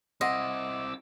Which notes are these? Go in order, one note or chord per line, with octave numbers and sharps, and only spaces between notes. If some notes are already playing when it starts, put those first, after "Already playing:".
C4 E4 D#5 F#5 C6 D6 E6